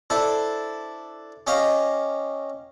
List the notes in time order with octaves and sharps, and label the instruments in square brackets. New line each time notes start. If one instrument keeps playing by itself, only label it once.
[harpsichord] D4 E4 A4 C5
C#4 G4 D#5 F5 A#5 C#6